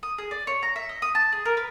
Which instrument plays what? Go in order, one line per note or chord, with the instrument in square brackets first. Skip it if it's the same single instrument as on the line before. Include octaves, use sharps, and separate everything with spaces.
[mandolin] D#6
G#4
D5
C#5
A#5
E5
D#5
D#6
A5
G#4
A#4
B4